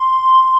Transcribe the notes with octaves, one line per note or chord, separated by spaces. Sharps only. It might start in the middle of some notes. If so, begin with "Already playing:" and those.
Already playing: C6